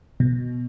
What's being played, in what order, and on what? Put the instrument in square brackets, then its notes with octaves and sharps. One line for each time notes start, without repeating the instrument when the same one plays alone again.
[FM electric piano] B2